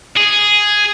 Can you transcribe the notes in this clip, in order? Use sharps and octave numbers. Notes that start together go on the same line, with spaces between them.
G#4